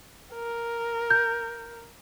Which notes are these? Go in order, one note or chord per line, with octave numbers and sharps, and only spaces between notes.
A#4
G6